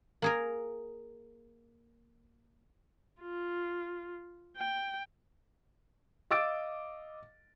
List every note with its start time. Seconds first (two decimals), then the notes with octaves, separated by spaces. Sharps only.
0.22 A#3 G#4 A#4
3.21 F4
4.57 G5
6.31 D#5 F5 D6 E6 A6 D7